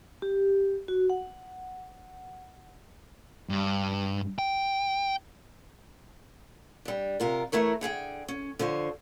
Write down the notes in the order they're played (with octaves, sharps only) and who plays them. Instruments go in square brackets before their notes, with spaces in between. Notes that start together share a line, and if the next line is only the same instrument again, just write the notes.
[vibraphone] G4
F#4
F#5
[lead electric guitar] G2
G5
[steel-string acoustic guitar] G3 D4
C3 F4 A#4
E3 A3 E4 A#4 C#5
D3 G#4 F5 G5
C#4
D3 F3 C5 C#5